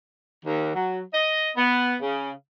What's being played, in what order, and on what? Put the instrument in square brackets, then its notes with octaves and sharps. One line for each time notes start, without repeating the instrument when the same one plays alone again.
[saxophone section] D#2
F#3
D#5
B3
C#3